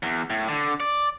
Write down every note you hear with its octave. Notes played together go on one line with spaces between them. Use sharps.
E2
A2
D3
D5